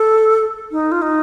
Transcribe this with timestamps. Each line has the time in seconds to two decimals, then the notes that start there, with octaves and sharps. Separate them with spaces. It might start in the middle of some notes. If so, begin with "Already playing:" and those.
Already playing: A4
0.72 D#4
0.91 F4
1.02 D#4